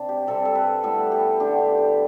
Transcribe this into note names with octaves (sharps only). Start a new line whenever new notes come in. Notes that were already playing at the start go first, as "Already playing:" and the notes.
Already playing: C3 D4
G4
C3 G3 C4 A4
A4
B4
A2 G3 B3 A4
G4
D3 A3 D4 G4
G4
G4